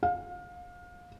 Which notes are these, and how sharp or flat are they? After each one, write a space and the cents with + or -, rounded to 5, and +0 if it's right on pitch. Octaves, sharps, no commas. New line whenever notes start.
F5 +30